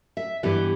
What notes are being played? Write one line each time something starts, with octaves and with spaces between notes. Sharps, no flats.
E5
G2 E3 B3 G4